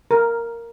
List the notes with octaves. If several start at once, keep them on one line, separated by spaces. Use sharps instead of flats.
A#4